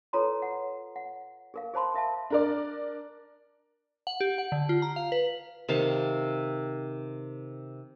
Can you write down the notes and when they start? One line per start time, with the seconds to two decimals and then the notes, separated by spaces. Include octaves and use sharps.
0.13 F4 A4 B4 C#5 A#5 C6
0.42 F#5
0.96 F#5
1.54 G#4 A#4 F5
1.74 G#4 C5 A5 B5 C6
1.94 A#4 E5 F5 A5
2.30 D4 A#4 D5
4.07 F#5
4.20 G4
4.38 F#5
4.52 D3
4.69 F4
4.82 A#5
4.96 F5
5.12 B4
5.69 C3 D#3 F5 A5